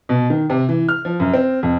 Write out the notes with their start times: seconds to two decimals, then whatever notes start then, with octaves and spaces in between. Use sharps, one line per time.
0.09 B2
0.30 D#3
0.50 C3
0.69 E3
0.89 F6
1.05 F3
1.20 F#2
1.33 C4
1.63 F2